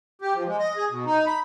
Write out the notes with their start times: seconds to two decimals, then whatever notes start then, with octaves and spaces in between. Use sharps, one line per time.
0.21 G4
0.35 F3
0.47 G#3
0.59 D#5
0.77 G#4
0.91 B2
1.06 D#4
1.26 B5